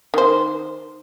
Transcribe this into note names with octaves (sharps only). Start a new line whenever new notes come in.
D#3 C5